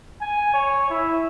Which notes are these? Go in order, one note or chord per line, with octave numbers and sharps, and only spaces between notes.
G#5
C#5
E4